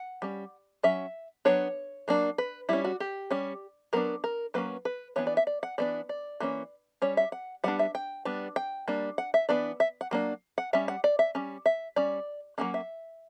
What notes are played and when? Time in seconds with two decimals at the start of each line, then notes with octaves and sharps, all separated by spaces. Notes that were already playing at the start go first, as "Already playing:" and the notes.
Already playing: F#5
0.22 G3 C#4
0.83 F#3 C#4 E5
1.45 F#3 B3 D4 C#5
2.08 F#3 A#3 D4
2.38 B4
2.69 G3 C#4 E4
2.84 F#4
3.00 G4
3.31 G3 C#4
3.93 F#3 B3 D4 A#4
4.24 A#4
4.54 F#3 A#3 C#4 B4
4.85 B4
5.16 E3 B3 D4 C#5
5.27 D5
5.37 E5
5.47 D5
5.63 F#5
5.78 E3 B3 D4 D5
6.09 D5
6.40 E3 A#3 C#4
7.02 G3 C#4 C#5
7.17 E5
7.32 F#5
7.64 G3 B3 D4 F#5
7.79 E5
7.95 G5
8.25 G3 B3 D4
8.56 G5
8.88 G3 A#3 D4
9.18 F#5
9.34 E5
9.49 E3 B3 D4 D5
9.80 E5
10.01 F#5
10.11 F#3 A#3 D4
10.58 F#5
10.73 G3 C#4 E5
10.88 F#5
11.04 D5
11.19 E5
11.35 G3 C#4
11.66 E5
11.96 G3 C#4 D5
12.58 F#3 A#3 C#4 F#5
12.74 E5